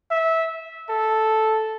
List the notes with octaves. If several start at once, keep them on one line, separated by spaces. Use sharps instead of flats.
E5
A4